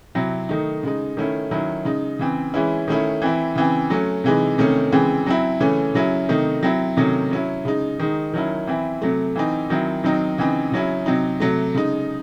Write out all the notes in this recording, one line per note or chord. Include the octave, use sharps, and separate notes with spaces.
C3 F#3 C4 E4
D#3 A3 D#4
C#3 G#3 D#4
D#3 A3 C#4 E4
D#3 F#3 C#4 E4
C#3 G#3 D#4
C#3 E3 C4
E3 G#3 C#4 E4
D#3 A3 C#4 E4
E3 C4 E4
C#3 E3 C4
F#3 A3 C#4
C3 E3 G#3 D#4
C3 D#3 A3 C#4
C#3 E3 G#3 C4
F#3 C4 E4
C#3 E3 A3 C#4
C#3 F#3 C#4 E4
C3 D#3 A3 D#4
F#3 C4 E4
C3 D#3 F#3 A3 C#4
F#3 C#4 E4
C#3 G#3 D#4
D#3 G#3 D#4
D#3 F#3 C#4 E4
E3 C4 E4
C3 F#3 A3
E3 C4 D#4
D#3 F#3 C4 E4
D#3 F#3 C4 D#4
C#3 E3 C4 D#4
C#3 F#3 C#4 E4
C3 F#3 C4 D#4
C3 F#3 A3
C#3 G#3 D#4